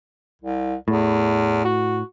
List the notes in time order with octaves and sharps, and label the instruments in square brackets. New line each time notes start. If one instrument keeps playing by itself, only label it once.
[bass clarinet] C2
[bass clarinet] E2 [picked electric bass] A2
[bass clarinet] F#4